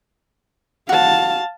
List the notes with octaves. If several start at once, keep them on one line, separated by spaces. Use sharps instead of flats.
F#4 F5 A5